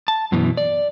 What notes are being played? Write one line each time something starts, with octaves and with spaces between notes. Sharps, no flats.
A5
F#2 B2 E3
D5